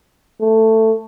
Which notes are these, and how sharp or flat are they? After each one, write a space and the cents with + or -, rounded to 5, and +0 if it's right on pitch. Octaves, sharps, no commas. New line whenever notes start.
A3 +15